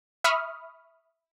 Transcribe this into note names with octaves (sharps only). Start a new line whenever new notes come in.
E5 B5 C#6 D#6 F6